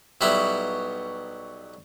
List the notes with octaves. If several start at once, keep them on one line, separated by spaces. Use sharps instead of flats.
B1 F#3 G3 B3 E4 E5